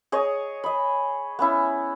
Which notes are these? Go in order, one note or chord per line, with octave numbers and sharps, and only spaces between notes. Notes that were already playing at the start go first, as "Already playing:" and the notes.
G#4 C#5 D#5
D#5 B5
B3 C#4 E4